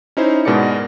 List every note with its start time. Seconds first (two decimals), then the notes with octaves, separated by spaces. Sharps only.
0.17 C#4 D#4 E4 C5
0.45 G#2 B2 G#3 A#4 D5 C#7